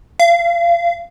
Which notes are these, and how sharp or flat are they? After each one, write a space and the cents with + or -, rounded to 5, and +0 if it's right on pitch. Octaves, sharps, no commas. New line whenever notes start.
F5 -30